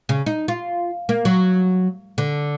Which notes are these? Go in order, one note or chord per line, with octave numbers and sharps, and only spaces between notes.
C#3
D#4
F4
A#3
F#3
D3